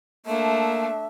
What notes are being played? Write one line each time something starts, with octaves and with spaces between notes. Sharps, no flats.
A3 A#3 D4 E5